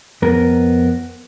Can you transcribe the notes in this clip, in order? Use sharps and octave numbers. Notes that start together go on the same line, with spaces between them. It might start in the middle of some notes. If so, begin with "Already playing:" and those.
F2 B3 A#4